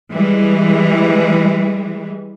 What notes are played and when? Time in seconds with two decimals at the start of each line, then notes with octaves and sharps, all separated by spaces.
0.13 E3 G3 G#3